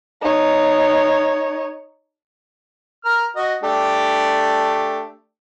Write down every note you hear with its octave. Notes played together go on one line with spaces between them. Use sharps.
D#4 C#5
A#4 F6
F#4 D#5
A3 D4 G4